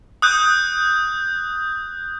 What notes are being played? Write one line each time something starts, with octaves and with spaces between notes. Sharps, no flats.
D#6 F#6 G6